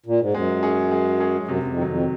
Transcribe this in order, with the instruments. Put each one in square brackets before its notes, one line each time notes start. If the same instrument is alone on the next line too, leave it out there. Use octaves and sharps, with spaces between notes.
[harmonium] A#2
G#2
[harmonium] F#2 [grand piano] G#3
[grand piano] C#4 G#4
G#3
C#4 G#4
[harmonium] F#2 [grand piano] C3
[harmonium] F#2
F2
[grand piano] D#3 F#3
[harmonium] F2